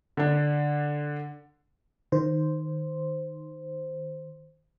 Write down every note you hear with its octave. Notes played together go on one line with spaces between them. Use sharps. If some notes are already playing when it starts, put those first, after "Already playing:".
D3 D4
D#3 C5